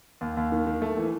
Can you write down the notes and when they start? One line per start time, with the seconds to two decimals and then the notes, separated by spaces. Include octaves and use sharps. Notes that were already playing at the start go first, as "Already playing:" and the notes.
0.21 D#2
0.37 D#2
0.52 D#3
0.67 D#3
0.82 A3
0.97 E3